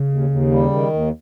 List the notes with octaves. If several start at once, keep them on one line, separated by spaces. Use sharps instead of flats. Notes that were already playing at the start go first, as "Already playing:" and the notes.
Already playing: C#3
D#2
D#2
G3
D#3
D#2